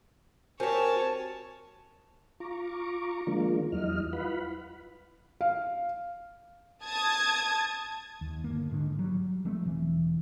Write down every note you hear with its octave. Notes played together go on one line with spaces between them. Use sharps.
C4 F#4 G4 A#4 C#5 G#5 A5
F4 A#5 C#6 D6
D#3 F3 G#3 A#3 D4 F4
E2 F#3 G3 E4 D#5 F6
E4 F4 B4 F5 F#5 B5
F5
A5 D#6 G#6
D#2
G1 A#3
G#2 D3 D#3
F#3 G3
F3 G#3 A3 C4
E1 E3